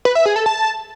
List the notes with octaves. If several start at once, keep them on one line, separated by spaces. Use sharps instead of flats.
B4
E5
G#4
A4
A5